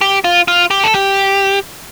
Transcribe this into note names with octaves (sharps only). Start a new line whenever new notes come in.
G4
F4
F4
G4
A4
G4